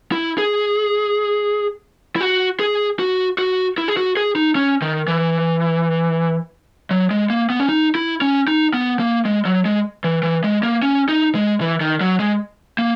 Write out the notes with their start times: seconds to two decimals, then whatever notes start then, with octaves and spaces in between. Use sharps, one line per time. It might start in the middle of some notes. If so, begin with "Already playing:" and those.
0.12 E4
0.38 G#4
2.16 E4
2.21 F#4
2.60 G#4
2.99 F#4
3.38 F#4
3.78 E4
3.88 G#4
3.97 F#4
4.17 G#4
4.35 D#4
4.55 C#4
4.82 D#3
5.08 E3
6.91 F#3
7.11 G#3
7.30 A#3
7.50 B3
7.60 C#4
7.69 D#4
7.95 E4
8.21 C#4
8.48 D#4
8.74 B3
9.00 A#3
9.25 G#3
9.45 F#3
9.65 G#3
10.04 E3
10.23 E3
10.44 G#3
10.63 A#3
10.82 C#4
11.09 D#4
11.35 G#3
11.61 E3
11.81 D#3
12.01 F#3
12.20 G#3
12.78 A#3